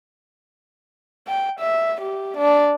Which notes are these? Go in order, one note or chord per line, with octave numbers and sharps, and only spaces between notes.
G5
E5
G4
D4